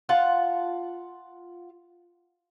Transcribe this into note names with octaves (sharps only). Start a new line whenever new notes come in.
F4 F#5 A5